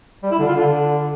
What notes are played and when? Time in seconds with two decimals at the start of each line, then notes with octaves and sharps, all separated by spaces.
0.23 G3
0.31 E4
0.39 D3
0.47 F4
0.55 D3